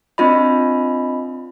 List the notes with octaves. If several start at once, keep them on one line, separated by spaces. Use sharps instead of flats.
C4 D4 F4 D#5 B5